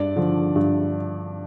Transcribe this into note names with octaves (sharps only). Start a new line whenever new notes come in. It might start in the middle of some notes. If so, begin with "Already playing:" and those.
Already playing: G2 D5
D3 F3
G2